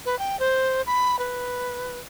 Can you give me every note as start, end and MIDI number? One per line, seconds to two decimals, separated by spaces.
0.06 0.18 71
0.19 0.39 79
0.40 0.82 72
0.86 1.19 83
1.19 1.99 71